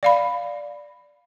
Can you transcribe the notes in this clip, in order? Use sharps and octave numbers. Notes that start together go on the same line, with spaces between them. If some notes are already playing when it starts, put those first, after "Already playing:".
D5 F5 B5